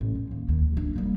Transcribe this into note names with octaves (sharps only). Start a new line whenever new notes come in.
A1
E2
D#2
D#2
A#2 D4
G3 A#3